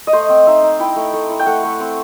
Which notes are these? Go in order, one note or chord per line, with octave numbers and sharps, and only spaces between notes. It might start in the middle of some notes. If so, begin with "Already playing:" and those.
D#5
A3 C5
C4
D#4 E5
D#4
E4 G5
A3
A3
E4
G5
A3 F#5
A3
C4